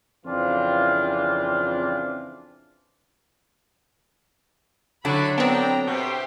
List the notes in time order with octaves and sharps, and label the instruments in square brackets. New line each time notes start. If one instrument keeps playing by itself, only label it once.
[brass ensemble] F2 C#3 E3 C4 D4 F4
[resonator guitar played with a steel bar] D3 F#3 [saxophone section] D4 E4 F#4 [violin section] B5
[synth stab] B3 C4 [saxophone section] D4 [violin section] G5 A#5
[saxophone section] B2 [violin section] G4 C5 E5